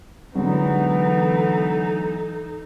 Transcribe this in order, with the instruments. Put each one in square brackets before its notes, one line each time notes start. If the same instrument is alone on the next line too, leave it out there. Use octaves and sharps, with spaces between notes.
[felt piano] D3 F#3 G#3 [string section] E3 [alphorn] B3 [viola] D#4 A4